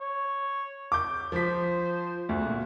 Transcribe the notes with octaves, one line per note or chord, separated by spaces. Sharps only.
C#5
D6 G6
F3 C5 B6
D2 F#4
A#2